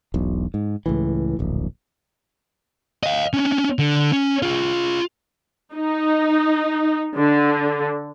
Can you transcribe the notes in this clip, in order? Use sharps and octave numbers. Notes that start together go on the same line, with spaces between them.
E1 B1
G#2
C#2 A2 E3
D1 A#1
D#5 F5
C#4 D4
D3
C#4
F4 G#4
D#4
D3